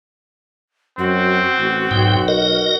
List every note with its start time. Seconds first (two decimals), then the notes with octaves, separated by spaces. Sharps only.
0.98 F#2 C4 F#4
1.58 A1
1.91 B1 G#2 G5
2.28 A#4 D#5